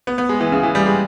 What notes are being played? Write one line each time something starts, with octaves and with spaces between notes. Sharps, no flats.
B3
B3
G#3
E3
C#3
E3
G3
G#3